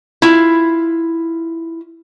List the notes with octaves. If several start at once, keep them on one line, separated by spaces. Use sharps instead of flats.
E4 F4